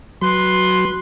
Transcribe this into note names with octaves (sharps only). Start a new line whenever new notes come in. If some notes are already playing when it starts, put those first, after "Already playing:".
F#3 B4 C6